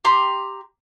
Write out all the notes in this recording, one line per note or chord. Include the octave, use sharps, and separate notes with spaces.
G4 A#5 C6